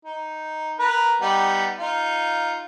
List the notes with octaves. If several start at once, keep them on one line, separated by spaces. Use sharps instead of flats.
D#4
A#4 B4 A#5
G3 B3 D#4
D#4 F4